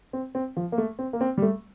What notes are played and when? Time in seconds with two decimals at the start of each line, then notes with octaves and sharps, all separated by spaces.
0.13 C4
0.35 C4
0.57 F3
0.72 A#3
0.78 A3
0.99 C4
1.13 A#3
1.21 C4
1.38 G3
1.42 A3